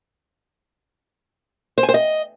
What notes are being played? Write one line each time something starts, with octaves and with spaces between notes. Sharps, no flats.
C5
G#5
C5
D#5